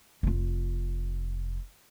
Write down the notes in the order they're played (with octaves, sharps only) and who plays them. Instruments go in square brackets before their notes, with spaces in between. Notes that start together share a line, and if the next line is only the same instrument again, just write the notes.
[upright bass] F1 F4